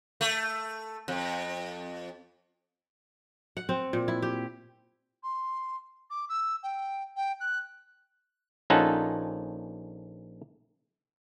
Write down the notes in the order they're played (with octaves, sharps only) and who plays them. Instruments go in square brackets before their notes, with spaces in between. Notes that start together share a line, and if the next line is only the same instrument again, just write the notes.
[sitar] A3
F2
[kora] F#5
C4
A#2
E4
G4
[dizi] C6
D6
E6
G5
G5
F#6
[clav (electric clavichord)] A#1 C#4 D#4 F4 A4 F#5